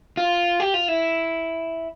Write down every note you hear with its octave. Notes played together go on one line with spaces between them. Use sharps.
F4
G4
F4
E4